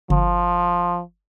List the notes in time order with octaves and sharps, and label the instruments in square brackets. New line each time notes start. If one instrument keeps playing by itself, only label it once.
[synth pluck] G1 [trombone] F3